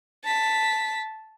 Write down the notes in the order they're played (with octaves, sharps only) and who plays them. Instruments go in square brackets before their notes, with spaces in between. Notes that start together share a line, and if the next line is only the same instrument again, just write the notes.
[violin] A5 B6